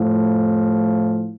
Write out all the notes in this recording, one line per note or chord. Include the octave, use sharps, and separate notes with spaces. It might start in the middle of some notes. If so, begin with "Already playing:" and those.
Already playing: A2 F3